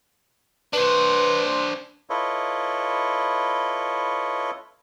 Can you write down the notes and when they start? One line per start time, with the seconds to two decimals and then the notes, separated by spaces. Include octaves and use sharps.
0.73 D4 B4 C5
2.10 E4 F4 A4 B4 C#5 D#5